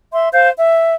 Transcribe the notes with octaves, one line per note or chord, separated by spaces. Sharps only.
E5 C6
C5 F5 G6
E5